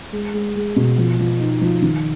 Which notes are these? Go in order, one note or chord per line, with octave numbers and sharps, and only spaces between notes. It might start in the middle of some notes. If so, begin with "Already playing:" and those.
G#3
G#3
G#3
B2
F3
F3
D#4
F3
D#3